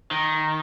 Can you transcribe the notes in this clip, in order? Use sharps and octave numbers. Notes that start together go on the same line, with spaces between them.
D#3